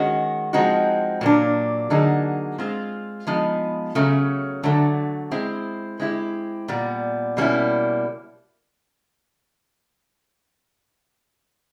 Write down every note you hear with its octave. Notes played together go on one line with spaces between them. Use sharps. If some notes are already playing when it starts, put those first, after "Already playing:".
Already playing: D#3 G#3 C#4 F#4
F3 G#3 C4 D#4 F#4
A#2 F#3 A#3 D4
D3 F#3 A#3 D#4 G#4
G#3 C4 F4
F3 G#3 B3 D#4
C#3 F#3 A3 C#4
D3 F#3 A3
G#3 C4 E4
G#3 C4 E4 G4
A#2 G3 B3
B2 G3 A#3 C#4 E4